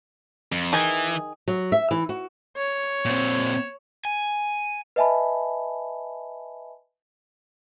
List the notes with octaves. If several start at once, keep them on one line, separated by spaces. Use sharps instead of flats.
F2
D#3 E3 G#4
F#3
E5
E3
F#4
C#5
A#2 C4
G#5
B4 D#5 E5 G#5 A5 B5